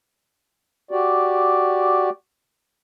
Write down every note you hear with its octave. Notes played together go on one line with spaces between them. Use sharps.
F#4 G4 D5